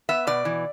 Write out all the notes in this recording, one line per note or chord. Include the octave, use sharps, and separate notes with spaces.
B3 E5
B2 D5
E3